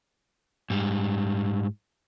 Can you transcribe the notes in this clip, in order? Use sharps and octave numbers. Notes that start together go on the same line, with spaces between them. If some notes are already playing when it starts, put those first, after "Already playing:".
G#2 G3